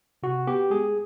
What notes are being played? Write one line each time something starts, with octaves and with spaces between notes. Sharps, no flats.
C3 F#4
B3 G4
G#3 G#4